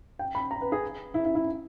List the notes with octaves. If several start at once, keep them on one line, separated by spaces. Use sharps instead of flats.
G5
B5
A#5
B4
G#4
E4
E4
E4